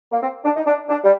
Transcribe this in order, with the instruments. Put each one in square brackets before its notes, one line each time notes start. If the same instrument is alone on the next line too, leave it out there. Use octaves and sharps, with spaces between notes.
[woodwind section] A#3
C4
D4
D#4
D4
D4
G3